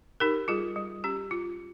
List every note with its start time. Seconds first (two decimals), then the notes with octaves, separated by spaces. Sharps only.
0.20 D#4 G4 A#4
0.48 G3 F4 G#4
0.76 G3
1.04 C#4 G4
1.31 F4